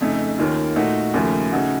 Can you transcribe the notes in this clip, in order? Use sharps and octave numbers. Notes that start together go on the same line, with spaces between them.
F2 C#3 A3 D#4
D#2 D#3 A#3 C#4 F4
A#2 A3 D#4 F#4
D#2 C#3 F3 A3
C#3 A3 D#4 F#4